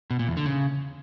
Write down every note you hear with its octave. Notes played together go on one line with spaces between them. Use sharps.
B2
A#2
E2
D3
C#3